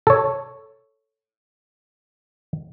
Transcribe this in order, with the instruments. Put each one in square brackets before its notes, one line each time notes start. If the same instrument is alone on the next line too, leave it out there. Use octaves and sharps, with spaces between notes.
[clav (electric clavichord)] A4 C#5